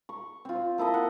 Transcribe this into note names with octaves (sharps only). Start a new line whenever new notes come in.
C#6
C4 F4
A#3 E4 A4 D#5
F#5